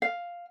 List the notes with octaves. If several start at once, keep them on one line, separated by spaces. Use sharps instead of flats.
F5